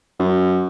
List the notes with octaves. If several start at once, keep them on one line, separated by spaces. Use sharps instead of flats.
F#2